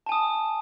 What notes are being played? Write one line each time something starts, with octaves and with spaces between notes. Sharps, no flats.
G#5 A5 D#6